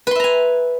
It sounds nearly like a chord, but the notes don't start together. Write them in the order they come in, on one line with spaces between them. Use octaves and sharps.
B4 C6 E5 A#5 G#5